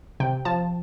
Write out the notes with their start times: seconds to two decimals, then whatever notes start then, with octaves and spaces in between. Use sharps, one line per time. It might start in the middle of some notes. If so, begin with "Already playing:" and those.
0.20 C3 G5
0.45 F3 A5